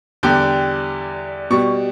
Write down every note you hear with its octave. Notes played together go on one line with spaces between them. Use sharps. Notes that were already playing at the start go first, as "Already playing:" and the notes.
E2 D3 G3 G5
B2 G3 C#6